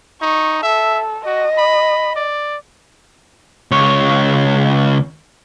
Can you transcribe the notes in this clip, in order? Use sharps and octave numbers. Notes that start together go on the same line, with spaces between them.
D#4 C#6
A4 E5
F#4 D#5
B5
D5
C#2 C#5